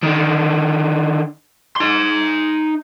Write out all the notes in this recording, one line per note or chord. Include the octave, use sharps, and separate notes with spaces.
D3 D#3
D#4 C6